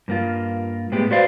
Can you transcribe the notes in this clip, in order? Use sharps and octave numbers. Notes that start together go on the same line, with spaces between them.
G2 A#3 F4
A2 G#3 B3 G4
F#4 B4 C5 D5 F5